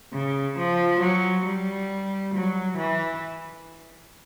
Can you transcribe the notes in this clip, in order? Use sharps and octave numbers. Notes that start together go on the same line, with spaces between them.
C#3
F3
F#3
G3
F#3
E3